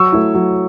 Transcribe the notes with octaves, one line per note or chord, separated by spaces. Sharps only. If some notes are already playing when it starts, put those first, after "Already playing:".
Already playing: F#3 C#6 E6
A3 E4
F#3